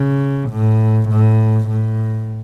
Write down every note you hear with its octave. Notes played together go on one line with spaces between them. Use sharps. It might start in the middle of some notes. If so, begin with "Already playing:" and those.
Already playing: C#3
A2
A2
A2